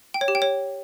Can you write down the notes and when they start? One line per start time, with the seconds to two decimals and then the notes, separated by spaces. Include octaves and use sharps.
0.14 G5
0.21 C#5
0.28 G4
0.35 G5
0.42 C#5